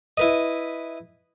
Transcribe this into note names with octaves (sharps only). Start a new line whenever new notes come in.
E4 B4 D#5